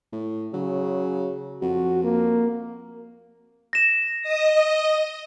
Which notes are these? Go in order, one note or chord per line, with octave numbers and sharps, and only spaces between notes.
A2
C#3 F#3
F2 F#4
A#3
A#6 E7
D#5 D#6